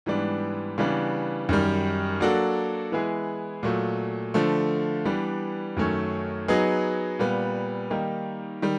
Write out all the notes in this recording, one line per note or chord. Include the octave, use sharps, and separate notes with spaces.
G#2 E3 G3 B3 D4
C#3 E3 G3 B3 D4
F#2 D#3 G3
F#3 A#3 D4 F#4 A4
E3 G#3 B3 E4 G#4
A#2 F#3 A3
D3 F3 A3
E3 G3 B3 D4
F#2 D#3 F#3 A3 C#4
F#3 B3 D#4 G#4
A#2 G3 B3
D#3 G3 A#3 D#4 G4
D#3 G3